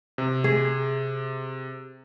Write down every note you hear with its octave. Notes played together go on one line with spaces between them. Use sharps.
C3
G#4